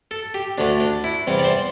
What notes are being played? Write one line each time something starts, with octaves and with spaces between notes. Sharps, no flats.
A4
G4
D2 D3 A3 D4
D4
E4
E2 C3 G3
D5
C5